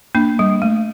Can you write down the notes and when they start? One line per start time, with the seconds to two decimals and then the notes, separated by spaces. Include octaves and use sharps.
0.15 A#3 D4
0.39 G3
0.62 A3